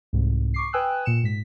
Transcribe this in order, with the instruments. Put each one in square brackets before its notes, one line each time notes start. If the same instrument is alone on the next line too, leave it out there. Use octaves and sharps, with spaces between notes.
[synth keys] C2 G#2
C#6 D6 C7
B4 G5 G#5 D#6 E6 F#6
A#2 C#7 E7
G#2 B6